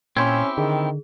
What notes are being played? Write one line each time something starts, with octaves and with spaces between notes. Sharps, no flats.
A#2 C4 C#4 E4 G4 C6 G6 G#6
D3 D#3 G#4